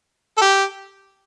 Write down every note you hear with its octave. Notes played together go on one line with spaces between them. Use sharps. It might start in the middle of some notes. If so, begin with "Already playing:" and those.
A4
G4